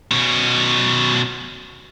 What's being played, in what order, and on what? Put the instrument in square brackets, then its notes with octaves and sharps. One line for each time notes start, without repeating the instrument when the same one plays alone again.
[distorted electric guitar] B2 C#4